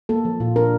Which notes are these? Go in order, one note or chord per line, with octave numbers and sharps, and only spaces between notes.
A#3 A4
F3
A#2 F4
D4 A#4